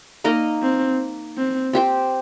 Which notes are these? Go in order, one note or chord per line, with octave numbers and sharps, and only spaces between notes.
A#3 D#4 A#4 D#5
C4
C4
C4 G4 C5